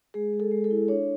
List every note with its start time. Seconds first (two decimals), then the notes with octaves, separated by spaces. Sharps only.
0.14 G#3 G#4
0.33 G#3
0.40 A4
0.51 G#3
0.64 A4
0.71 E4
0.88 D4 C#5